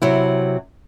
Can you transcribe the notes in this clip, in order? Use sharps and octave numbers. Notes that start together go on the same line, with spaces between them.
C3 F#3 E4